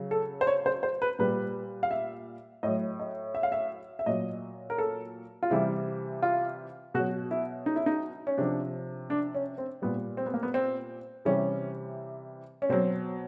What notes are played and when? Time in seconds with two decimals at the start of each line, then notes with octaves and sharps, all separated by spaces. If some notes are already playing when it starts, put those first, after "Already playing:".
Already playing: C#3 F#3
0.11 A4
0.41 C5
0.47 C#5
0.66 C5
0.83 C5
1.02 B4
1.19 A#2 G3 B4
1.83 F5
1.91 E5
2.63 A2 F#3 D#5
2.99 D#5
3.35 E5
3.43 F5
3.52 E5
3.99 E5
4.06 A#2 F#3 D#5
4.70 A#4
4.78 A4
5.43 F4
5.50 C3 E3 G3 E4
6.22 F4
6.94 B2 F#3 F#4
7.31 E4
7.66 D#4
7.76 E4
7.86 D#4
8.27 C#4
8.38 C3 F3 D4
9.10 D4
9.35 C#4
9.58 C4
9.82 A#2 G3 B3
10.17 C4
10.26 B3
10.34 A#3
10.43 B3
10.54 C4
11.25 C3 E3 G3 C#4
12.62 C#4
12.69 B2 F#3 C4